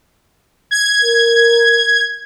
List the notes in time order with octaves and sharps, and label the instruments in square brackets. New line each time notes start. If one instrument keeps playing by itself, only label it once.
[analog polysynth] G#6
[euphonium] A#4